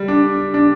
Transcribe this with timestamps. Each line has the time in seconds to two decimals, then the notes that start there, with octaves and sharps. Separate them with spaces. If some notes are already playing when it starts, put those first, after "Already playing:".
Already playing: G3
0.08 D4
0.54 D4